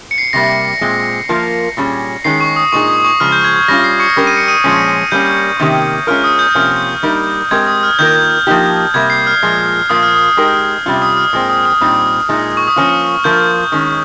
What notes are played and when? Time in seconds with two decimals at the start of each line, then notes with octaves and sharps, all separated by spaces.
0.11 C#7
0.18 C7
0.33 C3 G3 A#3 A#6
0.81 A#2 G#3 C4
1.29 F3 A#3 F4 A#4
1.77 A#2 G3 C#4 G#4
2.24 D#3 G#3 C#4 G#4 C7
2.41 C#6
2.56 D#6
2.72 A#2 G#3 D#4 G#4 C#6
2.89 D#6
3.04 C#6
3.20 C#3 F3 G#3 F6
3.32 G6
3.44 G#6
3.56 G#6
3.68 G3 C#4 F4 A#6
3.84 C7
4.00 C#6 C#7
4.16 G3 C#4 G4 A#4
4.27 D#7
4.37 C#7
4.48 D#6 D#7
4.64 A#2 F3 G#3 C#4
5.11 G3 A#3 C#4 G6
5.60 C3 D#3 A#3 C#4 G4
6.07 G#3 C#4 F4 A#4 F6
6.24 D#6
6.39 G6
6.55 C3 F3 A#3 C#4 F4
7.03 G3 A#3 D#4 A#4
7.51 G#3 C4 G4 A#4 G#6
7.67 D#6
7.83 F6
7.99 D#3 A#3 F4 A#4 G6
8.47 F3 A#3 D#4 G4
8.94 C3 G3 A#3 G#6
9.10 C7
9.27 F6
9.42 A#2 F3 G#3
9.89 A#2 F3 A#3 F4 D#6
10.03 F6
10.15 D#6
10.37 G#3 D#4 G4 A#4
10.86 C3 G3 C#4 F4
11.02 D#6
11.17 F6
11.33 A#2 G#3 C4
11.49 D#6
11.65 D#6
11.81 A#2 G3 C4 D#4 D#6
12.29 A#2 G#3 D#4
12.57 C#6
12.67 D#6
12.76 F3 A#3 C#4 F4 F6
13.24 F3 A#3 F4 A#4 G6
13.72 D#3 G#3 C#4